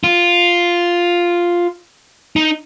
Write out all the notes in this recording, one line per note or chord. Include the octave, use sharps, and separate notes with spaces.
F4
D#4